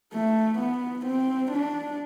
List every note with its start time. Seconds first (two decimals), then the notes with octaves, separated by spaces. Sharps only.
0.13 A3
0.59 B3
1.06 C4
1.52 D4